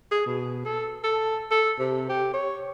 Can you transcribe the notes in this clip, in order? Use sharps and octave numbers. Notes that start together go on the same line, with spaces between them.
G#4
B2
A4
A4
A4
C3
G4
C#5